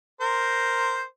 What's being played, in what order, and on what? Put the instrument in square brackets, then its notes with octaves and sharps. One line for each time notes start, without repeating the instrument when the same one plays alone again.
[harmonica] A#4 C5